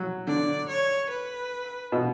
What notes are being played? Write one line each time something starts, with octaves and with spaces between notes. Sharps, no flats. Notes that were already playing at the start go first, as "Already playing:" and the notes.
Already playing: F#3
D3 D5
C#5
B4
B2